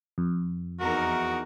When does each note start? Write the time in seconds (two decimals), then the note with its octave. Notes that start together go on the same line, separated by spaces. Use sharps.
0.18 F2
0.80 E2 D#4 F#4 A#4